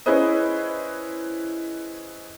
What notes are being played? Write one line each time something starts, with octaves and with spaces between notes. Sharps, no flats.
C#4 E4 G#4 B4 C5 D#5